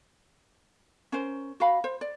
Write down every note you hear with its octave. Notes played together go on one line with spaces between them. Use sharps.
C#4 A#4 C5
F#4 D#5 F5 B5
C5
D5